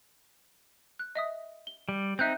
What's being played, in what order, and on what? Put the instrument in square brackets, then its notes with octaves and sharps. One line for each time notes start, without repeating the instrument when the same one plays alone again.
[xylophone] F#6
D#5 E5 D#6
G7
[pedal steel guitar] G3
[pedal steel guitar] C4 D#4 [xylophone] E5 F#6 G6